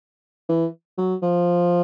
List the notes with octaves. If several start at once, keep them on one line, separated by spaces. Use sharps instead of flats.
E3
F#3
F3